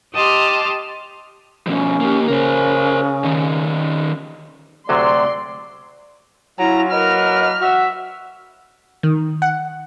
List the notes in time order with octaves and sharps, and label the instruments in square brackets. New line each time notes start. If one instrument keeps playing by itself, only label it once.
[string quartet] G4 D#5 A5 C6 D6 F6
[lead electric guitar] B2 F3 [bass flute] C#4
[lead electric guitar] A#3 G4
[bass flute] C#3 [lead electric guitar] A#4 C5
[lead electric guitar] D#3 C#4
[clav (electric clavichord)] D2 C3 F#3 [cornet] D5 [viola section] C6
[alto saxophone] F#3 [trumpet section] C#4 F4 [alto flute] E4 [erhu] A#5
[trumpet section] A#3 A#4 B4 [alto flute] D#5 [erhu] F6
[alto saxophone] F#4 [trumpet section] E5 F#5
[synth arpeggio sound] D#3
F#5